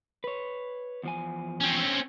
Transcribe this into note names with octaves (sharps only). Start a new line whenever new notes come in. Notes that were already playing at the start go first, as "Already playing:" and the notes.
B4 C#5
E2 F3 G#5
C4 C#4